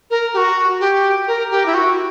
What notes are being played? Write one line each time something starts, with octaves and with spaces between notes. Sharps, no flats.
A#4
G4
F#4
G4
A#4
G4
E4
F#4